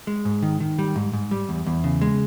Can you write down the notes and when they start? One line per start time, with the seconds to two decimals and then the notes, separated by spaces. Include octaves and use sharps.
0.07 G#3
0.25 G#2
0.43 D#3
0.60 D#3
0.79 G3
0.96 G#2
1.13 G#2
1.31 G3
1.49 E2
1.66 E2
1.84 C#3
2.01 G#3